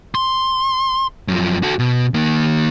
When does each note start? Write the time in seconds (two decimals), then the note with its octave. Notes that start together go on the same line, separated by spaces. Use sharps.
0.15 C6
1.28 F#2 F3
1.63 F#4 A4
1.79 B2
2.14 D#3 A#3